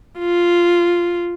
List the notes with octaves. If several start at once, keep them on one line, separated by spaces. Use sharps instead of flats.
F4